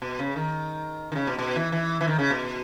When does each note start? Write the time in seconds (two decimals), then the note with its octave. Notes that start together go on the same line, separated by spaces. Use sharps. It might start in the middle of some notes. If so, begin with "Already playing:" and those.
0.02 B2
0.19 C#3
0.36 D#3
1.12 D#3
1.15 C#3
1.27 B2
1.38 B2
1.56 E3
1.72 E3
2.01 E3
2.08 D#3
2.19 C#3
2.30 B2